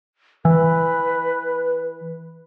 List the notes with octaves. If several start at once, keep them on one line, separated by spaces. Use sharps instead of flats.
E3 B4